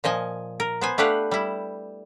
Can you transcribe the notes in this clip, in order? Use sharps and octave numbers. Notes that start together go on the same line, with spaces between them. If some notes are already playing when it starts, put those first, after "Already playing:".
A#2 F3 D#5 G#5
A#4
B3 C5 G#5
A3 D4 G4 B4 F5 F#5
G3 E4